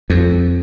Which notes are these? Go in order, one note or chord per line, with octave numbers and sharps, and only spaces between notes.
F2